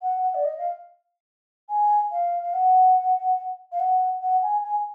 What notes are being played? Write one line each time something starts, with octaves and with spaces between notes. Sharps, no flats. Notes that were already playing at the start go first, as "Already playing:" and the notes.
F#5
F#5
D5
D#5
F5
G#5
F5
F5
F#5
F5
F#5
F#5
G#5
G#5